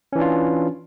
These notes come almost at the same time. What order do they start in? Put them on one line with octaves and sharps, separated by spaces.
C#4 E3 D4 F4